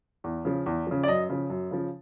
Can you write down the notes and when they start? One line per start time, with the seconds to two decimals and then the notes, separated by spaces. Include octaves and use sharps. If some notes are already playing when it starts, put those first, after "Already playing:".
0.24 E2
0.45 C#3 F3
0.66 E2
0.87 C#3 F3
1.04 D5
1.08 F#2 D#5
1.30 C#3 F3
1.50 F#2
1.71 C#3 F3